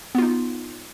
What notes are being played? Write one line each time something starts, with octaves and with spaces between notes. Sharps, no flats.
B3 D#4 F4